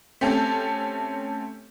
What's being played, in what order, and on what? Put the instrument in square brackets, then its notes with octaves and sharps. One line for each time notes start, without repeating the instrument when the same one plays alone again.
[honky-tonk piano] A3 C4 C#4 G4 A4